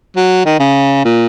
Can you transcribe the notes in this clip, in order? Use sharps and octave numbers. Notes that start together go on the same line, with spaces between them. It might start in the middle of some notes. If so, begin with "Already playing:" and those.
F#3
D#3
C#3
A#2